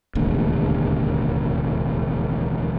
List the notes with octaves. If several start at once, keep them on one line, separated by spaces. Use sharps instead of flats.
E1 A1 D#2 D3